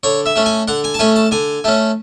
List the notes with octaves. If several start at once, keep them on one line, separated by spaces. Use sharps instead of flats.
D3 C#5
E5
A3 C#4
G#5
D3 F#5
G#5
A5
A3 C#4 G#5
A5
D3 G#5
A3 C#4